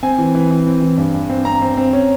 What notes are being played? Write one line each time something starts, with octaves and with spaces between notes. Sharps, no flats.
C4 G#5
E3
E3
E3
C4
E3
G2
G2
C4
C4 A#5
C4
C4
C#4